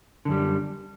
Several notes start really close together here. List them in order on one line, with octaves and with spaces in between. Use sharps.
D3 F#2 G3